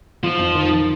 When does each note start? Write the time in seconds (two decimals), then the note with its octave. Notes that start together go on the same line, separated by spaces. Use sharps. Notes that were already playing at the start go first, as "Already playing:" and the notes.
0.23 F3 F4
0.39 F2
0.55 D#3
0.70 D#3